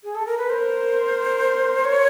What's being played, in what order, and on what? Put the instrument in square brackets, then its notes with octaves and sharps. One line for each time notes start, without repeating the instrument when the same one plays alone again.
[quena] G#4
A4
A#4
B4
[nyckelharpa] A#4 [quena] C5
[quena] C#5